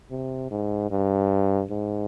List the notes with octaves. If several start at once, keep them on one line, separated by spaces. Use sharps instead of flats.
C3
G#2
G2
G#2